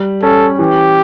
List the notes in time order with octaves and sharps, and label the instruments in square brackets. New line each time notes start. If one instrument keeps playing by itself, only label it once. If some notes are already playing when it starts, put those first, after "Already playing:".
Already playing: [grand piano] G3
[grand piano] C#4 [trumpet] A4
[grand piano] E3 [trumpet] G4